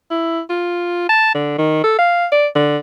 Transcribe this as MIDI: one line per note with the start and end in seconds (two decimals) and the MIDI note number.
0.11 0.41 64
0.50 1.06 65
1.09 1.33 81
1.35 1.57 50
1.58 1.83 51
1.84 1.97 69
1.99 2.26 77
2.32 2.47 74
2.55 2.77 50